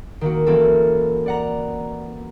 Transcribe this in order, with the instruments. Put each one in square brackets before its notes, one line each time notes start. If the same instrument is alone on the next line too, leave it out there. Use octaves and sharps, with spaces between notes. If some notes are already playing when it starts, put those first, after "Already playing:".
[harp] D#3 A#3 F#4
E3 A#3 C4 C#4 F#4 A4
D5 F#5 A#5